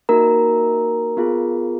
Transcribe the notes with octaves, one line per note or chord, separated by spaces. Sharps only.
A#3 D#4 F#4 A#4 A#5
B3 F4 G#4